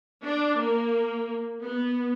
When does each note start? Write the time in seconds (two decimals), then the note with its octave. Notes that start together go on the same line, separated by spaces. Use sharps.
0.24 D4
0.61 A#3
1.61 B3